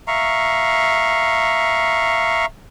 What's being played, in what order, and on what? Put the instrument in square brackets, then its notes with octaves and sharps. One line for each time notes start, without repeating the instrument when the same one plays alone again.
[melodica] E5 F5 A#5 C#6